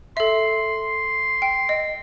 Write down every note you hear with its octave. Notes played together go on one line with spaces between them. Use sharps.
A4 E5 C6
G5
D#5